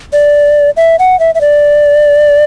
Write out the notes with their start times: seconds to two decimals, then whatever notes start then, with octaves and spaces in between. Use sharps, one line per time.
0.13 D5
0.77 E5
0.99 F#5
1.20 E5
1.35 E5
1.41 D5